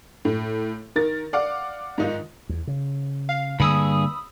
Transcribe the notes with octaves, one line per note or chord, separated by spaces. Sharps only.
A2
D#3 A#4 A6
D5 F5 F#5 D6
G#2 D#3 D#4 F4
E2
C#3
F5
G2 D3 A#3 G#4 B5 D#6 E6